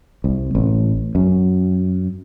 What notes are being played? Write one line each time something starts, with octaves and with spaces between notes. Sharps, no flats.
C2
A1
F#2